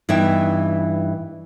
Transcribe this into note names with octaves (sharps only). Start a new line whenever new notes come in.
G2 E3 B3 D#4 E5 G5